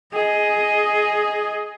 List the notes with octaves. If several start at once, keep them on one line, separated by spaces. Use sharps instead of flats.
G#4 D#5